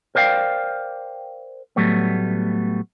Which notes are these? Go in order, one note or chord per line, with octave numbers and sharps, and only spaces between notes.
A#4 C5 D5 F5 G5
A2 F#3 G3 A3 B3